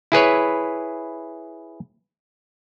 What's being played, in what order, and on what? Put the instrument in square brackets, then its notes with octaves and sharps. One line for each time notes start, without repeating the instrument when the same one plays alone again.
[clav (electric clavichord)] E4 G#4 B4 C#5